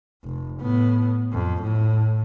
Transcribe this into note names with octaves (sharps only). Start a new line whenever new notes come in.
F1
A2 B3
F2
A2